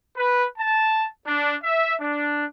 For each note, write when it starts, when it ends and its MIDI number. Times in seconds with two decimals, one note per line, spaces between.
0.16 0.46 71
0.59 1.06 81
1.27 1.55 62
1.63 1.94 76
2.01 2.46 62